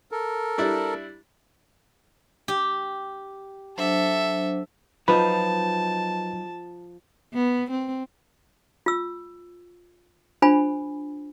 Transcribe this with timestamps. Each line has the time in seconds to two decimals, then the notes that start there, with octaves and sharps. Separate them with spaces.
0.11 A4 A#4
0.58 G3 D4 E4
2.48 G4
3.78 F#3 D4 A4 C5 E5
5.08 F3 F#3 D#4 B4 A5 B5
7.34 B3
7.70 C4
8.86 F4 E6
10.42 D4 F4 C5 G#5 B5